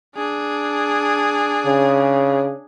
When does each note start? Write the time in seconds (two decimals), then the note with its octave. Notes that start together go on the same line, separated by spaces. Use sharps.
0.15 D4 G#4
1.66 C#3